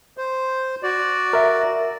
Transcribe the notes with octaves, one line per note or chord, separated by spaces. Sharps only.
C5
F#4 D5
A#4 E5